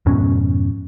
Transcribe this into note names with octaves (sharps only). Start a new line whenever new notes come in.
F2 G#2 B2 C#4